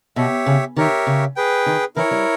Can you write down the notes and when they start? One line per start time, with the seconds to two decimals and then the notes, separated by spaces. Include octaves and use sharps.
0.16 B2 G4 C#5 E5
0.46 C#3
0.76 D#3 G4 A#4 C#5 E5
1.07 C#3
1.36 G#4 B4 G5
1.66 D#3
1.96 E3 E4 A#4 C#5
2.11 G3